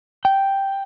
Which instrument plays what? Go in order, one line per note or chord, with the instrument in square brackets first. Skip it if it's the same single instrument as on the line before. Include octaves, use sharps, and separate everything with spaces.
[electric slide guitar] G5